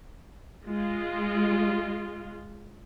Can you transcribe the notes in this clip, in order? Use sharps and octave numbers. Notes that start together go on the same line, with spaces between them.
G#3 F4